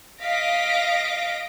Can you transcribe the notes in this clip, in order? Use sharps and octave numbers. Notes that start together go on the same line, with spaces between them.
D#5 F5 A#6 B6 D7